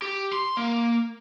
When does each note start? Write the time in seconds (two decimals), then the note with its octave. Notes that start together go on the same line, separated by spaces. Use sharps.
0.02 G4
0.33 C6
0.57 A#3